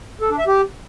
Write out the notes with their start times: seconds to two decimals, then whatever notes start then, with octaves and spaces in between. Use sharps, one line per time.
0.21 A4
0.30 D4
0.38 E5
0.47 G4